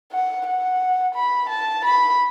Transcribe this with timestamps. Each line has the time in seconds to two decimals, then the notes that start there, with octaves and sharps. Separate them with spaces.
0.12 F#5
0.46 F#5
1.15 B5
1.50 A5
1.84 B5